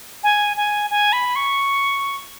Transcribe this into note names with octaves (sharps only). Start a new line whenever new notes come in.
G#5
G#5
G#5
B5
C#6